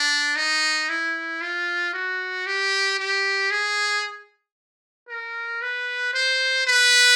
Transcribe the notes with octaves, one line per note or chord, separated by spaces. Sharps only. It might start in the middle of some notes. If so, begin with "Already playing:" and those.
Already playing: D4
D#4
E4
F4
F#4
G4
G4
G#4
A#4
B4
C5
B4